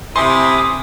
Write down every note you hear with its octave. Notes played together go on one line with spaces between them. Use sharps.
C3 E4 G#5 C6 D6 D#6